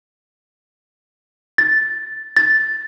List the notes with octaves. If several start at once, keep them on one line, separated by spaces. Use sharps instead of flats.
A6
A6